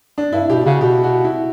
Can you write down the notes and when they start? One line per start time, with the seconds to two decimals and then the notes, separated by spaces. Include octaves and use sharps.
0.18 D4
0.33 G2 E4
0.49 B2 G4
0.66 C#3 F#4
0.81 B2 G4
1.03 F#4
1.25 E4